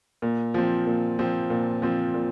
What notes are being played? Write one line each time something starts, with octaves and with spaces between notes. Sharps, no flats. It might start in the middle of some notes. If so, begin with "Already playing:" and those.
A#2
F3 C4
A#2
F3 C4
A#2
F3 C4
A#2